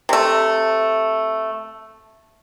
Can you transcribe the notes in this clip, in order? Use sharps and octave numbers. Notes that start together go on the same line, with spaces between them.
C3 A3